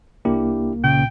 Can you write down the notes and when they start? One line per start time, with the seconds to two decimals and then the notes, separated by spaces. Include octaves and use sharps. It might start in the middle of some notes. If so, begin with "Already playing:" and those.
0.25 C2 A#3 D4 E4 G4
0.84 A#2 C#3 G5